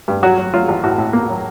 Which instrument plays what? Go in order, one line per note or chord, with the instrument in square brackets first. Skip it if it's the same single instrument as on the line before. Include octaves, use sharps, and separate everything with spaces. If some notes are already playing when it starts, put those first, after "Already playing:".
[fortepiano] G2
F#3 F#4
F#3
F#3 F4
A1
A2 F#4
A2
A#3
F#3